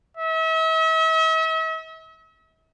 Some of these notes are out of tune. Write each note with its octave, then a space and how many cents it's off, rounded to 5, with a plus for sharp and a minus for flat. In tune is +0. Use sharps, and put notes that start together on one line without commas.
E5 -40